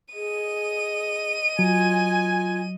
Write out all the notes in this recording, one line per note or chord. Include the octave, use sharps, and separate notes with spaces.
G#4 D#5 D#7
F#3 F4 G#5